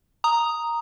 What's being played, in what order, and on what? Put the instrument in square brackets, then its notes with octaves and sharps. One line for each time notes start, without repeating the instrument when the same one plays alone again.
[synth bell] A#5 D#6